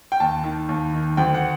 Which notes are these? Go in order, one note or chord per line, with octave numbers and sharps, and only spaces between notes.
G5
D#2 A5
D#3
D#2
D#3
D2 G5
F#5